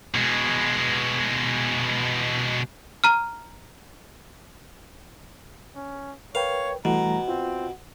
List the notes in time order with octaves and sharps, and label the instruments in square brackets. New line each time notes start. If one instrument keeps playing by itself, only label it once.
[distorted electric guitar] B2 G#3
[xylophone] A#5 F6
[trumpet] C#4
[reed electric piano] A#4 B4 G5 [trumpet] C#5 [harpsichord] F5
[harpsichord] B2 [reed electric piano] E3 G3 A3 [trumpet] A#5
[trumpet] C4 [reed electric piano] F4